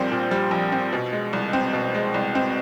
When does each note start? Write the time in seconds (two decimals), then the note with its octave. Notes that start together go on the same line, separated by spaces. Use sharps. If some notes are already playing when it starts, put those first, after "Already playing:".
Already playing: A#1 A#2 G3 C4
0.11 A#2
0.31 G3
0.51 A#1
0.72 C4
0.93 B2
1.13 G#3
1.33 C2
1.53 C4
1.73 B2
1.95 G#3
2.14 C2
2.35 C4